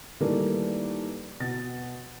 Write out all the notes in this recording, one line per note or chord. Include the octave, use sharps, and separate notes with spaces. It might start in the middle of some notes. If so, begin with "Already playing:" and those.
D#3 E3 G3 A3 A#3
B2 A6